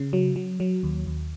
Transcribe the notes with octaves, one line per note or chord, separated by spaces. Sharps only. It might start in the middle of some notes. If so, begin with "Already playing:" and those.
Already playing: C#3
F#3
F#3
F#3
D#2
D#2